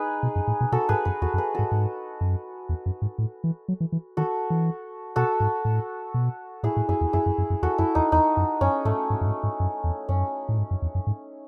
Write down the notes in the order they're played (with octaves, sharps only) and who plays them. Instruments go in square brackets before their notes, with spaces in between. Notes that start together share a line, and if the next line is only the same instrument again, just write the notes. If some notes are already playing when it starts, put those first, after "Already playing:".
Already playing: [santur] D#4 G#4 B4
[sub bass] B2
F#2
A2
B2
[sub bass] B2 [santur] F#4 A4
[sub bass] G#2 [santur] G#4 B4
[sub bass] F#2 [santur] G#4 B4
[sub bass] E2 [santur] F#4 A4
[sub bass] F#2
[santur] G#4 B4
[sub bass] G#2 [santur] F#4 A4
[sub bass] G#2
F#2
E2
F#2
G#2
A2
E3
F#3
E3
E3
[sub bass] D#3 [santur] F#4 A4
[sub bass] E3
[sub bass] B2 [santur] F#4 A4
[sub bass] G#2
A2
B2
[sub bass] A2 [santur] E4 G#4
[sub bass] A2
[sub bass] F#2 [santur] E4 G#4
[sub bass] E2
[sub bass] F#2 [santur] E4 G#4
[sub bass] F#2
F#2
F#2
[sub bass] E2 [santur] F#4 A4
[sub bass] F#2 [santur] E4
[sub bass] E2 [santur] D#4
[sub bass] E2 [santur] D#4
[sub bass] F#2
[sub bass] F#2 [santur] C#4
[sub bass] G#2 [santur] A3
[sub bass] G#2
F#2
G#2
G#2
F#2
E2
[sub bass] F#2 [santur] C#4
[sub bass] A2
G#2
F#2
E2
F#2
G#2